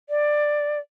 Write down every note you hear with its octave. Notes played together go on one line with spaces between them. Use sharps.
D5